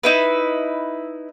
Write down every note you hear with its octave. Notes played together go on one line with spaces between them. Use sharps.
D#4 E4 B4